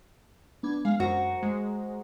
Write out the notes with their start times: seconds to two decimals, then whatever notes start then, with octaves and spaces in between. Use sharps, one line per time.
0.63 B3 D4 G#6
0.85 G#3 F5
1.00 F#2 F#4 C5 A#5
1.43 G#3